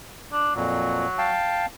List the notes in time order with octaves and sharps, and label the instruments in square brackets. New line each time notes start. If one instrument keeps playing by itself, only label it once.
[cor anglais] D4
[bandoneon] F2 A#2 [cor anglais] F#3
[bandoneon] F5 G5 A5